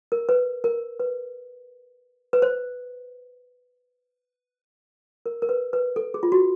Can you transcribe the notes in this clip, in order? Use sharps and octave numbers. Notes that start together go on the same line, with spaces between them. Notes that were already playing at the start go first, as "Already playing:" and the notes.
A#4
B4
A#4
B4
B4
C5
A#4
A#4
B4
B4
A4
G#4
F4
F#4